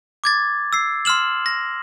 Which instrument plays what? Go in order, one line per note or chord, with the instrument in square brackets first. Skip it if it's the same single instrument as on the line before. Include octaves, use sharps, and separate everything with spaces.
[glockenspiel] D6 G#6 A6
E6 C7
C6 E6 F6 E7 F#7
A#6